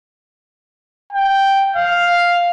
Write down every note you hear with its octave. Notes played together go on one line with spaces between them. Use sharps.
G5
F5